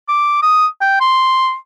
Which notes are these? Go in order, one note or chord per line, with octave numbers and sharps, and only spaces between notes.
D6
D#6
G5
C6